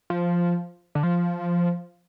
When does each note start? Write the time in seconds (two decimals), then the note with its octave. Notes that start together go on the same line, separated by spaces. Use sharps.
0.10 F3
0.95 D3
1.03 F3